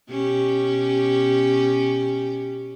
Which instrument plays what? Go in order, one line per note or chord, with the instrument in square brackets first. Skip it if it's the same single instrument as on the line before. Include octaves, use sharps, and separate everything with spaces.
[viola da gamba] B2 C#4 G4